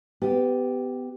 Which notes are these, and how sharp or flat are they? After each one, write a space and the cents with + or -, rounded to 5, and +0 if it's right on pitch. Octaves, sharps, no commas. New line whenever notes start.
B3 +25 G4 +0